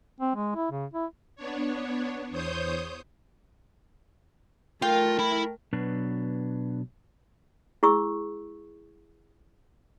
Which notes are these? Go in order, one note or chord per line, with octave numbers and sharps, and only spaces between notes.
C4
G#3
E4
C#3
E4
B3 D4 C#5
E2 C5 C#5 D#6 G6
A3 F4 A#4 G5
E4 B5
B2 F#3 B3 D4 B4
E4 G#4 C#6 E6